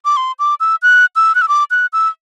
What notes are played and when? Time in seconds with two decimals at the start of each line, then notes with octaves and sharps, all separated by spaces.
0.05 D6
0.17 C6
0.39 D6
0.60 E6
0.83 F#6
1.16 E6
1.35 F#6
1.42 E6
1.49 D6
1.71 F#6
1.93 E6